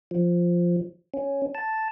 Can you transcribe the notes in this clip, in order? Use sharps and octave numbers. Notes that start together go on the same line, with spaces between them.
F3
C#4
A5